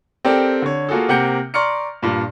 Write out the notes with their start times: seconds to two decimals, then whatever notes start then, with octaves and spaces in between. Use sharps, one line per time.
0.25 C4 G4 A4 A#4 D5
0.62 D3 C#5
0.89 A#3 F4 F#4 G#4 A4
1.09 C3 A#3 F#5 G5 G6 C#7
1.54 D5 A#5 C6 C#6 F6 C#7
2.03 G2 A#2